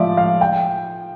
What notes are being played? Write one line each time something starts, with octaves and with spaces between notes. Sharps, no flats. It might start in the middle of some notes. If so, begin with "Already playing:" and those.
Already playing: A2 F3 D5 E5
F5
G5